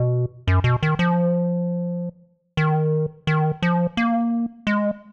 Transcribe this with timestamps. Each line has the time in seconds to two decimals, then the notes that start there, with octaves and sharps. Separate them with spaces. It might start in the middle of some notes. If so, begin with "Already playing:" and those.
Already playing: B2
0.48 F#2
0.64 B2
0.83 D#3
0.99 F3
2.57 D#3
3.27 D#3
3.62 F3
3.97 A#3
4.67 G#3